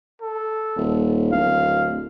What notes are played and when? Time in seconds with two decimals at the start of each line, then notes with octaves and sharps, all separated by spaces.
0.21 A4
0.76 D#1
1.32 D1 F5